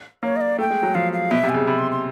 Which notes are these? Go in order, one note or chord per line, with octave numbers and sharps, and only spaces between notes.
A#3 C#5
D#5
D5
A3 G5
G#3
F#3
F3 F5
F5
B2 E5
C3
G#5
C#3
C3 B5
C6
C6